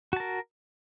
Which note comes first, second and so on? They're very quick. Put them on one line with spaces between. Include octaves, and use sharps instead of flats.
F#4 A5 A#4